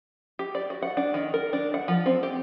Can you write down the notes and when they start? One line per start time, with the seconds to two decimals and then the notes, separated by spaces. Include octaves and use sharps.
0.39 G4
0.55 D5
0.70 F#4
0.82 F#5
0.97 D4
1.14 D#3
1.34 A#4
1.53 D4
1.74 F#5
1.88 F3
2.06 C4
2.23 G4